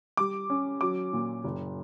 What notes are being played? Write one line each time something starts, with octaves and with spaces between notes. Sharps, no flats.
G3 D6
C#4
F#3 D6
A#2
F#1